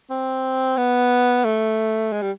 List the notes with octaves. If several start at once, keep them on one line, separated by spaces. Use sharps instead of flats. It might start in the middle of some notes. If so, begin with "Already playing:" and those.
C4
B3
A3
G#3
G3